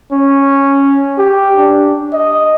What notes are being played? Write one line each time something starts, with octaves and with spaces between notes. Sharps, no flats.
C#4
G4
D4
D#5